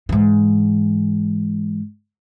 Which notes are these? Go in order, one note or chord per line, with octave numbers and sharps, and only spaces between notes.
G#2 E3